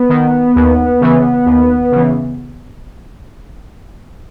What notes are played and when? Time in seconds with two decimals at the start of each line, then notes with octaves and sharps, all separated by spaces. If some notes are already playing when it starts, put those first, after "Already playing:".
Already playing: B3
0.09 D#3
0.56 D#2
1.01 C#3 E3
1.46 D#2
1.92 C#3 E3